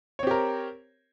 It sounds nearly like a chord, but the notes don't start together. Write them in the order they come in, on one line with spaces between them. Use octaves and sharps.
C#5 C4 G4 A#4